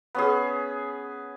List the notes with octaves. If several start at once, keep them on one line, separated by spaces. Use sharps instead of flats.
B3 C#4 G#4